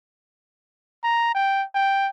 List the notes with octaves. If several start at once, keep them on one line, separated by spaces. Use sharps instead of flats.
A#5
G5
G5